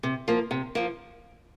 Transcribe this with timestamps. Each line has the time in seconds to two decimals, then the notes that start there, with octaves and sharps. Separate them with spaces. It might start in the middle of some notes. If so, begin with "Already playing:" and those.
0.03 C3
0.28 F3 A#3
0.51 C3
0.75 F3 A#3